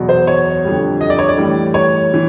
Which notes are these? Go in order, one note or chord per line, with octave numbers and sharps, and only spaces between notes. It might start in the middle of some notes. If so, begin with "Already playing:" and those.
Already playing: E2 B2 F#3
C5
C#5
F2 D3 G3
D#5
D5
C#5
D5
A2 E3 G3
C#5
E3